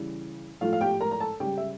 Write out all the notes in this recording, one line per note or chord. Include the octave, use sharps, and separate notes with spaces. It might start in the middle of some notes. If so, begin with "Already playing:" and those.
Already playing: C#3 E3 G3
A2 F3 A3 F4 F5
F5
G4 G5
A#4 A#5
A#5
A4 A5
C#3 G3 G4 G5
E5